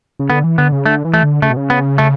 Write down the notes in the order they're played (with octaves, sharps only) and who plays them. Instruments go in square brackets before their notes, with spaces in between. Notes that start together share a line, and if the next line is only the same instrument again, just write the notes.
[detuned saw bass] C#3
[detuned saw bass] D3 [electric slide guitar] B3
[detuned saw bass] E3
[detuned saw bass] D3 [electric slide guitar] B3
[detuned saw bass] C#3
[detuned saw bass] D3 [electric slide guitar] A3
[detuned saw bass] E3
[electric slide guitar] A3
[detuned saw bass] D3
[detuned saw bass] C#3 [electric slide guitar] A3
[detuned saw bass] B2
C#3
[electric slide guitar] B3
A3